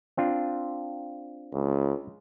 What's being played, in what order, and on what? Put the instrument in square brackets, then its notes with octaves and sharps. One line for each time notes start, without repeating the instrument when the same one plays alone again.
[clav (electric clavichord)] C4 D4 F4
[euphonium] C#2